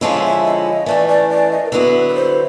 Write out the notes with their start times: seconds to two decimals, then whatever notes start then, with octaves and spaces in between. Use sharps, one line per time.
0.01 D3 F3 G#3 C#4 E4 F5
0.23 E5
0.44 D#5
0.86 E3 A3 C#4 D5
1.08 D5
1.30 D5
1.51 D#5
1.65 A#4
1.72 D3 F#3 B3 E4 B4
2.07 B4
2.15 C5